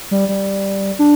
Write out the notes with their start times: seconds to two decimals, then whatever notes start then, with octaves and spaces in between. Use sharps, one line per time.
0.11 G3
0.29 G3
0.99 D4